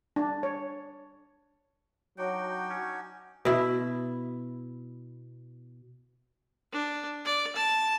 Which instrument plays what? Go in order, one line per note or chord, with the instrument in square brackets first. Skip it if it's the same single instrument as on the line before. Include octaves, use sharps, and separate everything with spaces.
[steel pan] D4
C#5
[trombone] F#3 [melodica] D4 D#4 F#4 [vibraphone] C#5 F#5 [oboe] G5
[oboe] C#4 [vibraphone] F#5 G#5
[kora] B2 E4
[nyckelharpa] D4
D5
A5